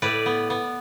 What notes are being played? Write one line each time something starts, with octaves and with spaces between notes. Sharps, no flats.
A2 B4 D5
B3
B3